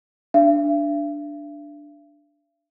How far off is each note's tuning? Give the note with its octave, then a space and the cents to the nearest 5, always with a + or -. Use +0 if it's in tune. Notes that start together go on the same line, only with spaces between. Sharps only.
D4 +0 E5 +45